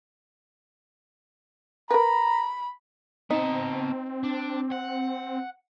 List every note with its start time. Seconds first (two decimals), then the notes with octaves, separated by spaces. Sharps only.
1.90 A#4 B4 A#5 B5
3.31 B3 C4 D#4 A5
4.23 D4
4.72 F#5